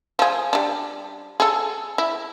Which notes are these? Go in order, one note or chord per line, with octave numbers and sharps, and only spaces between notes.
F3 G#4
G3 D4
G#4 A4
E4